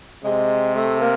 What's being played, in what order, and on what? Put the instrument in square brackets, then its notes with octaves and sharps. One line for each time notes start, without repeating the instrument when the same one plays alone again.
[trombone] C3 [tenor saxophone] G#3
[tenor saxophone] A3
A#3